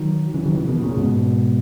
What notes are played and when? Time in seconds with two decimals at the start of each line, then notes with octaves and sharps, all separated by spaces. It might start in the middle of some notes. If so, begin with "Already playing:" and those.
Already playing: D#3 F#3
0.34 C#3 E3
0.46 D#3 F#3
0.56 C#3 E3
0.67 B2 D#3
0.82 A#2 C#3
0.97 G#2 B2